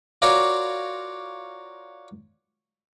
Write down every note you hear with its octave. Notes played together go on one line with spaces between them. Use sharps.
F4 F#4 A#4 C#5 D5 C#6